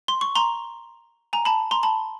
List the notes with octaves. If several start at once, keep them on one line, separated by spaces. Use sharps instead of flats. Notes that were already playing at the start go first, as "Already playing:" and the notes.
C6
C#6
A#5 C6
G#5 A#5
A5 B5
A#5 C6
A5 B5